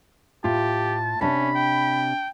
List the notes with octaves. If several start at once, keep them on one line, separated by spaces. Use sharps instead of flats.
A2 F4 G4 A5
C3 C#4 D4 A5 B5
G5